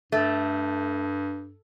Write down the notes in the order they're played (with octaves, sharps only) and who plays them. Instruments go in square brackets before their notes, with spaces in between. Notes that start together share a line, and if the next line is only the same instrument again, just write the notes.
[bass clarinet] G2 [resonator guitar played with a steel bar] A3